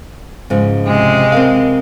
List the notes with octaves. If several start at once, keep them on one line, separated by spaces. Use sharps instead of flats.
G#2 C#3 F3
C3 G#3
C4 A#4 F5